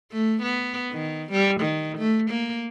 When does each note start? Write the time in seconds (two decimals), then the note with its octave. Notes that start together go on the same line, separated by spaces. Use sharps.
0.12 A3
0.42 B3
0.92 D#3
1.32 G3
1.61 D#3
1.98 A3
2.31 A#3